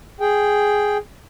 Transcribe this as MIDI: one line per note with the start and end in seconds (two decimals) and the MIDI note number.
0.20 0.97 68
0.20 0.97 79